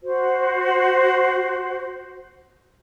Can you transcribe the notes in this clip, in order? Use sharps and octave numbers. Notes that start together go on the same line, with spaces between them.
F#4 C5